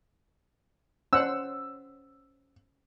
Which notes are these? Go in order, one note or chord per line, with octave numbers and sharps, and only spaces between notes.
C#4 C5 F#5 E6